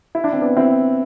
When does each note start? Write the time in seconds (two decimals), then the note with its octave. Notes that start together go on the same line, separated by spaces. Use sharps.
0.15 E4
0.24 D4
0.33 C4
0.41 B3 D4
0.57 C4 E4